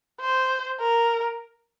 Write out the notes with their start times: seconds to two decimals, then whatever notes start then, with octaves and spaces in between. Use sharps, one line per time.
0.20 C5
0.80 A#4